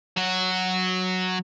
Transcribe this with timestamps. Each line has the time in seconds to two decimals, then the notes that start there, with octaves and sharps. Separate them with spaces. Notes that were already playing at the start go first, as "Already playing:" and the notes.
0.17 F#3 F#4